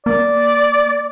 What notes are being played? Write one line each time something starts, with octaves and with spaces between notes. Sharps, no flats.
A#3 D5